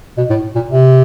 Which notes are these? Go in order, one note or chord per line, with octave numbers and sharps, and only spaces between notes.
B2
A2
A#2
C3